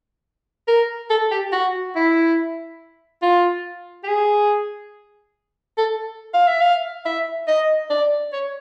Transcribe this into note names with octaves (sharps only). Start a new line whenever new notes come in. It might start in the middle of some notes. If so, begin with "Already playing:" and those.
A#4
A4
G4
F#4
E4
F4
G4
G#4
A4
F5
E5
F5
E5
D#5
D5
C#5